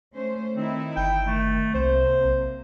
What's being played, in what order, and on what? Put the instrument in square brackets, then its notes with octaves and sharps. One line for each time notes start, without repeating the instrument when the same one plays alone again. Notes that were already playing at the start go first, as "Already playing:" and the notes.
[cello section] A3 C#4 C5
[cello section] D#3 D#4 E4 [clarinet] C4
[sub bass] G1 [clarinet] G5
[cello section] D#3 [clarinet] A3
[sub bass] C2 [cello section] C3 A#3 [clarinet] C5
[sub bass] B1